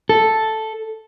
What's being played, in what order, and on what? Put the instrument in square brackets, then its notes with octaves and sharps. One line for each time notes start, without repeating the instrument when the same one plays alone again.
[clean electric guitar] A4